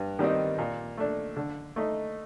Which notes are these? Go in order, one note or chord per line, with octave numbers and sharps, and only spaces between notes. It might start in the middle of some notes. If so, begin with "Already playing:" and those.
Already playing: G2
D#3 G3 C4 D#4
A#2
A3 D4
D3
A3 D#4